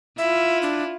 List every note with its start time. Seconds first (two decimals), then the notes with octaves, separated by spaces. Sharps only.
0.18 E4 F4 E5
0.62 D4